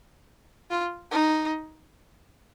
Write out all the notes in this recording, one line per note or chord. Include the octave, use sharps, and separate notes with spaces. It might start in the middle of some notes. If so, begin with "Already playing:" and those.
F4
D#4